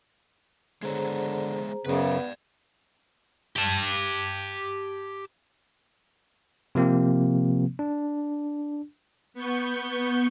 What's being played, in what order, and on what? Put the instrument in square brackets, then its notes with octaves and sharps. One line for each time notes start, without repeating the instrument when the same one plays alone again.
[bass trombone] D3 [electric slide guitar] G#3 B3 C#5 [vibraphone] G#4 C5 A#5
[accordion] F#2 C#3 [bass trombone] B3 [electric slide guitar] B4 D5
[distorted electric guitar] G4 A5
[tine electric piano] C3 F3 A#3 C4
D4
[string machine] B3 C#6 G6